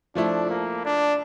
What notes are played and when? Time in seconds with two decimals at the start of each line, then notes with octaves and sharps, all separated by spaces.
0.15 F3 A3 D4 E4
0.50 A#3
0.85 D4